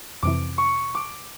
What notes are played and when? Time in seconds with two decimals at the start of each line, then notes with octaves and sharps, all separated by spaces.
0.23 F2 C3 E3 D6
0.58 C#6
0.95 D6